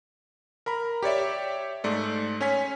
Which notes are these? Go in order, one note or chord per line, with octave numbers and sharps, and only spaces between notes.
A#4 A#5 B5
G4 C#5 D5 E5
G#2 A3 D5
C#4 C#5 G#5 B6